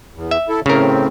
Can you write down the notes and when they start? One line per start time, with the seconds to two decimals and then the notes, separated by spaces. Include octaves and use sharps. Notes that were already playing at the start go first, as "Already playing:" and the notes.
0.14 E2
0.31 E5
0.49 E4 A4
0.66 A2 C#3 C4 A#4